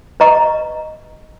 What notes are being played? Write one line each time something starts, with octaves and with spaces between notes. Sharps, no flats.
B4 D#5 A#5 C#6